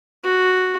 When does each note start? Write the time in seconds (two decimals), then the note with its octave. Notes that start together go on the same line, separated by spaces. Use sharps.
0.24 F#4